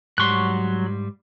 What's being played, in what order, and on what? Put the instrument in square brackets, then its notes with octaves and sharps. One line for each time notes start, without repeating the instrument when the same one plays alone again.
[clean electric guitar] G#2 G3 C6 [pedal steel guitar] F#3 C#6 F#6